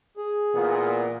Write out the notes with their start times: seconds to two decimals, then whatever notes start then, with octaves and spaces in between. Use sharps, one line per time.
0.17 G#4
0.54 A#2 E3 B3